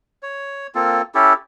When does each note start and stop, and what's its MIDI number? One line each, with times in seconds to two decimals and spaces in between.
0.23 0.67 73
0.75 1.02 58
0.75 1.02 60
0.75 1.02 65
0.75 1.02 69
1.15 1.33 61
1.15 1.33 64
1.15 1.33 67
1.15 1.33 69